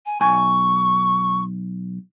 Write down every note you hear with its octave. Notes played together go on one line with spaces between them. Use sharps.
G#5
B1 G#5 C#6